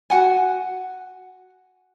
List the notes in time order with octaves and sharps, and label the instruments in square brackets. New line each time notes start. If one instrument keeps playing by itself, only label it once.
[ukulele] F#4 F#5 G#5